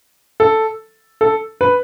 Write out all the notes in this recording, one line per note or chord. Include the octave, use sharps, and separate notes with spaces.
A4
A4
B4